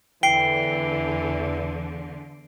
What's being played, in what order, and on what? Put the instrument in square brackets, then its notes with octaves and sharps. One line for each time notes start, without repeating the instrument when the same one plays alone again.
[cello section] E2 D3 [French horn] E3 [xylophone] G5 [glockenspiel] C7 D7 G7